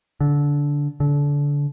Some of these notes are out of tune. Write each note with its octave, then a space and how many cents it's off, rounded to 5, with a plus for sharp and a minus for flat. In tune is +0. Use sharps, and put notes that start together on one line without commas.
D3 -20
D3 -25